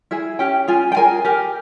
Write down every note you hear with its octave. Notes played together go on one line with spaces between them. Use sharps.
E4 G#4 E5
C#4 G4 G5
F4 G#4 G#5
G5
G#4 A#4 G#5
G4 A#4 G5